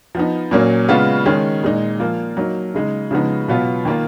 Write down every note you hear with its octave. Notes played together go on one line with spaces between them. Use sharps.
F3 B3 D#4
A#2 F#3 A#3 C#4
C#3 G#3 B3 F4
D#3 G#3 C#4
A#2 G#3 D#4
F3 A#3 F4
F#3 A#3 D#4
C#3 G#3 D#4
C#3 F3 G#3 B3 D#4
B2 F#3 B3 F4
D#3 A#3 F4